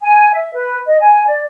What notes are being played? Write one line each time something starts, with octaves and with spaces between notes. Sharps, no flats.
G#5
E5
B4
D#5
G#5
D5